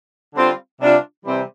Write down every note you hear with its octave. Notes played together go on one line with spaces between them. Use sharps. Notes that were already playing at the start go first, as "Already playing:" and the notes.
D3 G3 C4 F4
C3 G3 D4 F4
C3 E3 G3 C4